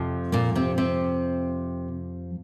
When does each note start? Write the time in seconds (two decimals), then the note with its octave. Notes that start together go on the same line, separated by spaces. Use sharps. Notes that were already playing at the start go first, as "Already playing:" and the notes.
Already playing: F2 C3 F3
0.32 A#2 A#3
0.55 C3 C4
0.78 C3 C4